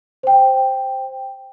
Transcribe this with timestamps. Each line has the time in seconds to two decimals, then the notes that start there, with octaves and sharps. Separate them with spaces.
0.23 C5 G5